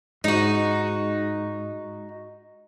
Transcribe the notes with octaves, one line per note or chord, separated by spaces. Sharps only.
G#2 D#4 F#4